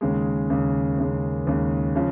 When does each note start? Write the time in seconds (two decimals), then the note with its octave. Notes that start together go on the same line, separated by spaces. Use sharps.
0.01 D#2 C#3 G#3
0.50 D#2 C#3 G#3
0.98 D#2 C#3 G#3
1.47 D#2 C#3 G#3
1.96 C#3 F3